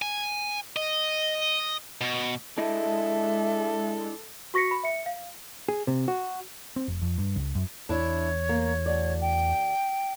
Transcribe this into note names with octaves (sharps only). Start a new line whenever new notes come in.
G#5
D#5
B2
G#3 D4 E4 A4 D#5 E5
F#4 C#6 A#6 B6 C#7
B5
E5 C#7
F5
G#4
C3
F#4
C4
F1
F2
G2
C#2
F#2
E2 D4 E4 C#5
A#3
D2 D5
G5